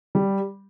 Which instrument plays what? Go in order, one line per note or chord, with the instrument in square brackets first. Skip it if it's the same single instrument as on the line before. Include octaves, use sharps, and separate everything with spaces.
[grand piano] G3